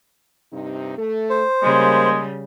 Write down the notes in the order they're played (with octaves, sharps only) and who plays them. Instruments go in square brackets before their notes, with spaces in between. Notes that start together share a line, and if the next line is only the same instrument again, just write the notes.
[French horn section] G2 C3 D#4
A3 A4
[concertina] C5
[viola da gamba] C#3 G3 [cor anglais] G#3 [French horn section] A#3